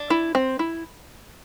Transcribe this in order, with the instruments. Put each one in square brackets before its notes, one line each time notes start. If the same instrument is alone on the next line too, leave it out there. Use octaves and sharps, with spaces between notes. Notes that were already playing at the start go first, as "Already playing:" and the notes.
Already playing: [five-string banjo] D4
E4
C4
E4